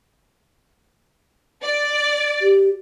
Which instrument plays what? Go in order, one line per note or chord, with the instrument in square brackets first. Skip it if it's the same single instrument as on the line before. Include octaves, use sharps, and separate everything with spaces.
[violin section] D5
[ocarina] G4